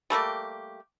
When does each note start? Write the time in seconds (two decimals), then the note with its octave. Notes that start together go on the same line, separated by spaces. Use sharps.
0.10 G3 A3 A#3 G4